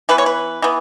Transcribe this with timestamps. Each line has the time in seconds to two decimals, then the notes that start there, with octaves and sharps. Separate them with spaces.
0.09 E3 B3 B4
0.18 C#5
0.26 B4
0.62 E3 B3